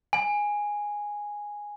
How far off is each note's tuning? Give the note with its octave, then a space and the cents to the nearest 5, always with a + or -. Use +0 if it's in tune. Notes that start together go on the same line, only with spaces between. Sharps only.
G#5 -5